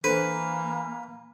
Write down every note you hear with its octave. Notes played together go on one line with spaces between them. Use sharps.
E3 A#3 D4 A4 B4 C5